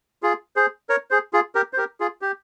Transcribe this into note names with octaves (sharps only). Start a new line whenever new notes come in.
F4 G#4
G#4 C5
A#4 C#5
G#4 C5
F4 G#4
G4 A#4
C5
G4 A#4
F4 G#4
G4